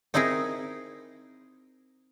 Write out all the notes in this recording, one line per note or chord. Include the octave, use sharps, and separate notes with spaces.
C4 D#4 E4 G#4 A#4